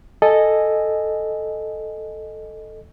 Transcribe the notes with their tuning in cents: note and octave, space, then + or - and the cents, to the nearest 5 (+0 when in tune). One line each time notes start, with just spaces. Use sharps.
A4 +0 D#5 -10 G#5 +0